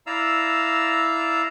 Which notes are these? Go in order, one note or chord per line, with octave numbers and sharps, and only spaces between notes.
E4 D5 F5 A#5 E6